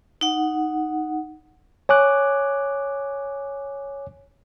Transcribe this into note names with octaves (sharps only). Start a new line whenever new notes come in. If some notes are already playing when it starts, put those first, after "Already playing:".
D#4 F#5
C#5 G#5 D6 F#6